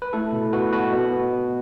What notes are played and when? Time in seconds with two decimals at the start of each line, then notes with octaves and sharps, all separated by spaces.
0.02 B4
0.13 A3 E4 A4
0.33 B2
0.53 B2 F#4 B4
0.73 B2 F#4 B4
0.93 B2
1.13 B3
1.33 B2